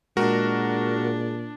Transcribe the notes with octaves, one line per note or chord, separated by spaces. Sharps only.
A#2 G#3 D4 F#4 A#4